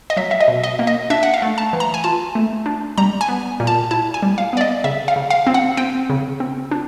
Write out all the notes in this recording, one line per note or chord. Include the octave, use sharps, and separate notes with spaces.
D#5
F#3 E5
E5
D#5
B2
D#5
A#3
D#5
D4 E5
F#5
F5
A3
A5
E3
A#5
G#5
F4 A5
A3
D4
G3 A#5
G#5
B3
A#2
A5
E4 A5
G#5
G3
F5
B3 D5
D#5
C#3 E5
F5
C#3
F5
C4
F#5
C4 G5
C#3
C4
D4